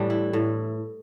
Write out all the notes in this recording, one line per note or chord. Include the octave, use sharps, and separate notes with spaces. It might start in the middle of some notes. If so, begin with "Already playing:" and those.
Already playing: A2 E3 G3 D4
E4
A2